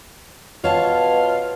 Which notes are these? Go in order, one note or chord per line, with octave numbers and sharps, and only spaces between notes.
B2 F4 C#5 A5